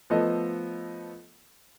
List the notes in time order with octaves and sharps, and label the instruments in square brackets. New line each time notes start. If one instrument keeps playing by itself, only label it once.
[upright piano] F3 A3 B3 A4 D#5